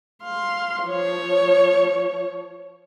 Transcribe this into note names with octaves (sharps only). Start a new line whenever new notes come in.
F5 C6
F3 C#5